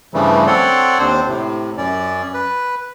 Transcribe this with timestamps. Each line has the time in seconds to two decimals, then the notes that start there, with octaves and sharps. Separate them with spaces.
0.14 G2 C#3 E3 F3 G3 A3
0.47 C4 A4 C#5 D5 F#5 C6
0.99 D#2 C4 D4 C5
1.28 A2 C3
1.77 F#2 C#4 D5
2.34 B4